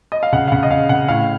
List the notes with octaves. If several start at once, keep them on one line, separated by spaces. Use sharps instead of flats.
D#5
F5
C#3 F#5
F5
C#3 F#5
D#5
C#3 F5
C#3 F#5
A2 F5